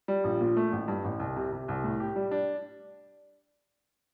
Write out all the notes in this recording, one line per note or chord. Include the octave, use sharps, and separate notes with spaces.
G3
A#1
A#2
A3
A1
G2
A1
C2
C3
C3
C2
A2
G4
G3
D4